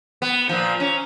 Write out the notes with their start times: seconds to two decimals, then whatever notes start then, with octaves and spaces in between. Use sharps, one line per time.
0.22 B3
0.49 A#2 F3
0.80 C#4